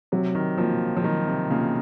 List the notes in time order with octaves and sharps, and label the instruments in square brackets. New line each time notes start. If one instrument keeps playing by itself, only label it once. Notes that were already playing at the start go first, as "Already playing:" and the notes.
[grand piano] C3 [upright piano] F#3
[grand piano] D#3
[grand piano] F3 [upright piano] A#3 F4
[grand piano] F3
[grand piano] D#3 [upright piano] F#3
[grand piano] C3
[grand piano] C#3 [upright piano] A#3 F4